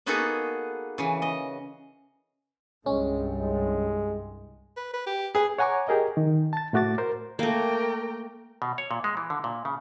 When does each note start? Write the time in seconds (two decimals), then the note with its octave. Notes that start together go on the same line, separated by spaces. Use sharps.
0.06 A#3 B3 D#4 F#4 G#4 A4
0.98 C#3 E3
1.22 D#5
2.86 C2 G2 G#3 C#4
3.39 G#3
4.77 B4
4.93 B4
5.06 G4
5.35 G#4 B4
5.59 C#5 F#5 G#5 A#5 C#6 D6
5.88 G4 G#4 A#4 D#5
6.17 D#3
6.53 A5 A6
6.73 A2 A3 F#4 D6 A6
6.98 A#4 C5
7.39 A3 A#3 A#4 G5
8.62 B2
8.78 C#5
8.91 A#2
9.04 G#3
9.17 E3
9.30 D3
9.44 A#2
9.65 C#3